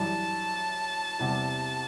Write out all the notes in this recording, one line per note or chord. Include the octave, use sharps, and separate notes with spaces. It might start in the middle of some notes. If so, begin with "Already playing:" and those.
Already playing: F#2 E3 G3 D4 A5
E2 C3 G3